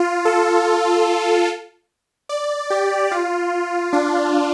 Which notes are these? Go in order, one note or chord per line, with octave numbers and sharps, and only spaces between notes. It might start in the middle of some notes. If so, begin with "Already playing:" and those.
Already playing: F4
A4
D5
G4
F4
D4